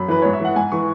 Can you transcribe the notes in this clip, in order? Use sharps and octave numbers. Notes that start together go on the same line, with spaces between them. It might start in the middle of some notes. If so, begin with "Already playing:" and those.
Already playing: F#2 B5
E3 B4
G#2 C#5
E5
E3 F#5
G#2 G#5
E3 C#6